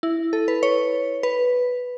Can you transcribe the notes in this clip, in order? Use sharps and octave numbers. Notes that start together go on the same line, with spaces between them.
E4
A4
B4
C#5
B4